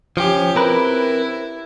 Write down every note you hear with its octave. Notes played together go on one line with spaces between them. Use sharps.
F3 C#4 G4
C4 E4 A#4 B4